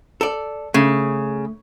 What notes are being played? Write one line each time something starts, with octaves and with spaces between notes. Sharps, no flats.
A4 D5
C#3 A3